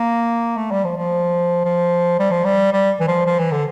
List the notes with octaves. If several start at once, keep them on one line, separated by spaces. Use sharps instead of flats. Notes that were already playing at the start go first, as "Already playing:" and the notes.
Already playing: A#3
A3
G3
F3
F3
F3
G3
F3
G3
G3
E3
F3
F3
E3
D3